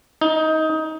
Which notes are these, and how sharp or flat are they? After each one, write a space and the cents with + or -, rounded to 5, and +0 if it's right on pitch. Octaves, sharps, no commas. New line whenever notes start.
D#4 +20